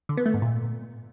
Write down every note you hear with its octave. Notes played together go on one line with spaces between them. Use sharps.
D3
B3
A3
G#2
A#2